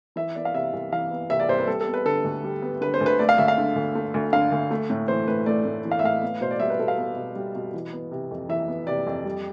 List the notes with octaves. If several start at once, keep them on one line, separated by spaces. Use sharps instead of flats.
E3 E5
B3 D5
F5
C3 E5
C2
E3 F5
B3
C3 E5
D5
C2 C5
B4
G3 A4
A4
B3
B4
D3 A4
D2
G3
B3
D3 B4
C5
D2
B4
A3 D5
F5
D2 E5
F5
D3
D2
A3
D2
D3 F5
D2
A3
A2
E3 C5
A2 B4
A3 D5
A2
E3
F5
E5
A2 F5
B3
B2 C5
D5
G3 E5
B4
B2 A4
F5
B3
B2
G3
B2
E3
B3
C3
F2
E3 E5
B3
C3 D5
F2
G3